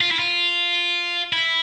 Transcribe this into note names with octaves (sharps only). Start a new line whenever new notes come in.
F4
E4
F4
E4